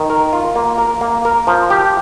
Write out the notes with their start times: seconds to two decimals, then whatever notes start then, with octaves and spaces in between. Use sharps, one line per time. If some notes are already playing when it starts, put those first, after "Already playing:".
Already playing: D#3
0.10 A#4
0.33 F4
0.56 A#3
0.78 A#4
1.01 A#3
1.25 A#4
1.47 F3
1.70 G4